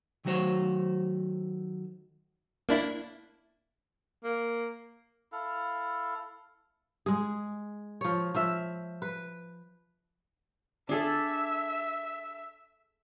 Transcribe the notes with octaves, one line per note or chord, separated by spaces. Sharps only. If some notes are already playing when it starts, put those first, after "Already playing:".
D#3 F#3 A3 F#4 C5 C#5
A#3 D4 E4
A#3
E4 A4 F5
G#3 G#4
F3 C#5
F3 E5
B4
D4 G#4 A4 E5